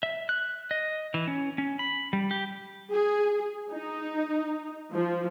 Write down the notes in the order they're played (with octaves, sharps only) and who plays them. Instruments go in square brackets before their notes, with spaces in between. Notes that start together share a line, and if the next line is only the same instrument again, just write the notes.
[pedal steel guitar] E5
F#6
D#5
E3
C#4
C#4
B5
G3
G4
[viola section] G#4
D#4
F3